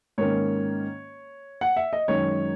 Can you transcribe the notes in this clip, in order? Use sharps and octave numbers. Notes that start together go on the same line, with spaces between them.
G#2 D#3 A#3 C#4 C#5
F#5
E5
D#5
F#2 D#3 G#3 C#4 C#5